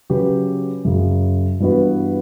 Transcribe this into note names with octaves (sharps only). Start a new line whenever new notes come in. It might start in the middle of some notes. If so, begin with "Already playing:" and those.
C#3 F#3 C#4 G4 B4
F#2 C#3 F#3
G2 E3 B3 F#4 B4